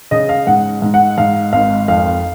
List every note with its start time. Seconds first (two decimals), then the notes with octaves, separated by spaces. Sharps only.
0.11 C#3 D#5
0.29 F5
0.47 G#2 F#5
0.82 G#2
0.94 F#5
1.18 G#2 F5
1.53 G#1 F5
1.88 F2 F5